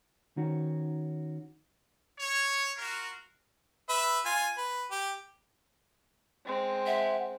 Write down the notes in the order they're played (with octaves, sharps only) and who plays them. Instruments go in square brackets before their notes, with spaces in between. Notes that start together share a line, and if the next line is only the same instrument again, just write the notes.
[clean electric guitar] D#3 C#4 F#4
[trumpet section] C#5
F4 F#4 A#4
[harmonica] B4 E5
F4 G#5
B4
G4
[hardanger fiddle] G#3 C4
[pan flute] E5 [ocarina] F#5